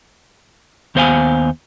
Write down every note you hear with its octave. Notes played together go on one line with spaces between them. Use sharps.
D#2 B3 C5 D5 F5 G#5